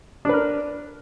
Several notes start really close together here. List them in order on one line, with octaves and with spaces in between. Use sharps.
D4 B4 A#4